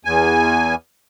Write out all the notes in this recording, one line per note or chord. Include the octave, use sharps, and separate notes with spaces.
E2 G#5